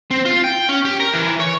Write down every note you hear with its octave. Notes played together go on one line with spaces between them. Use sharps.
C4
F4
G5
C#4
G4
A#4
E3
C#5